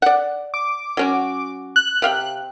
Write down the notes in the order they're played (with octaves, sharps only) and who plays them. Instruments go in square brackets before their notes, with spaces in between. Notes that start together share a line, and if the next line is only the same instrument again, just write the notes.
[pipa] D5 F#5
[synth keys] D6
[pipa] F#3 C#4 F#4
[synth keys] F#6
[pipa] C3 F5 G5